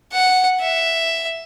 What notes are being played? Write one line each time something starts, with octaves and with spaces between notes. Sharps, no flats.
F#5
E5